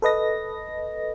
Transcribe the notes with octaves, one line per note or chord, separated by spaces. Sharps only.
A4 B4 D#5 A#6